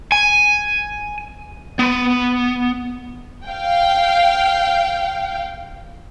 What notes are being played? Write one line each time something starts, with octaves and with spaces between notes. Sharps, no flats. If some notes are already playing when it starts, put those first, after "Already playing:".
G#5
B3
F5 G5